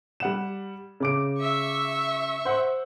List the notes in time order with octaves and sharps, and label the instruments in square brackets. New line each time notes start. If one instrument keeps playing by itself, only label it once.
[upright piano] G3 F#5 E7
C#3 D6 D7
[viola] E5 C#6
[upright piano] C5 F#5